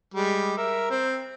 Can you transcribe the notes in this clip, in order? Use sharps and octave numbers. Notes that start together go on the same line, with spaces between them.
G3 G#3
A#4 E5
C4